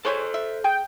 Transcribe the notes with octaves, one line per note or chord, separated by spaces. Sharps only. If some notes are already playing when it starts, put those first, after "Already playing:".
G#4 A4 C5 C#5 G#5 C6
E5
G#4 G5